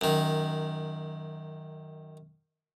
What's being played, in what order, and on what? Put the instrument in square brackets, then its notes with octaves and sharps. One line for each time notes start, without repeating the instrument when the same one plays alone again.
[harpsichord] F#2 D#3